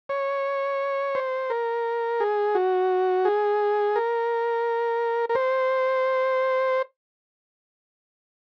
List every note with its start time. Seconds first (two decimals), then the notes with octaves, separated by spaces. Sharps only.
0.09 C#5
1.15 C5
1.50 A#4
2.20 G#4
2.55 F#4
3.25 G#4
3.96 A#4
5.29 A#4
5.35 C5